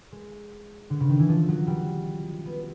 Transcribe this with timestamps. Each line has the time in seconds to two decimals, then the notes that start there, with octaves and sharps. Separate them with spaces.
0.12 G#3
0.90 D3
1.00 C#3
1.09 D#3
1.19 E3
1.29 F3
1.48 F#3
1.67 G3
2.45 B3